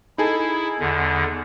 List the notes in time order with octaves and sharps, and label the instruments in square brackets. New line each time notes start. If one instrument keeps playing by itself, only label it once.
[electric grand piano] D#4 G#4 A4 [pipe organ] E4
[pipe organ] E2 D3